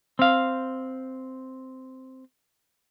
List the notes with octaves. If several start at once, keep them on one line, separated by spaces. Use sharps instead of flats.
C4 F5